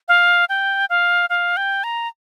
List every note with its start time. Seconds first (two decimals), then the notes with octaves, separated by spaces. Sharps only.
0.08 F5
0.49 G5
0.90 F5
1.30 F5
1.57 G5
1.84 A#5